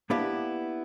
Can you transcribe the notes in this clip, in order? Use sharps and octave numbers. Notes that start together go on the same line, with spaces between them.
A#3 B3 D4 E4 G4 B4